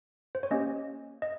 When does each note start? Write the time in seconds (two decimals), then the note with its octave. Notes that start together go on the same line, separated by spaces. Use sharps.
0.35 C5
0.43 C#5
0.51 A#3 C#4 G4 D#5
1.22 D#5